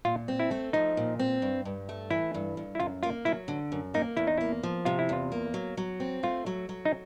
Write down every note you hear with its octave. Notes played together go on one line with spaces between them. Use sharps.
A#2 F4
C4
E4
A3
F3 D#4
A#2
C4
G2
G2
A3
E3 E4
G2
G2
E4
F#2 F4
A#3 F4
F#3 E4
D3
F#2
A#3 D#4
E2 E4
D#4
A#3 E4
F3
C3 F4
E4
E2 F4
A#3
F#3
F#3
C4
A3 F4
F#3
F#3
D#4